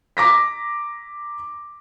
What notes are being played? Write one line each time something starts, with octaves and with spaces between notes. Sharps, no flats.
A#5 D6 A#6 B6